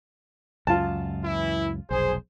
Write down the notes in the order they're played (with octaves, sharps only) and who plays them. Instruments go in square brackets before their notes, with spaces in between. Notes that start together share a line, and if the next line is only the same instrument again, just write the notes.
[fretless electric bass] C#2 F#2 [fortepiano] F4 A5
[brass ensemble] E3 E4
[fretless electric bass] F1 B1 [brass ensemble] G#4 C5